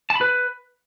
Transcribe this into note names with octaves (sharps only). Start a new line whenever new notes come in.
A5
B5
B4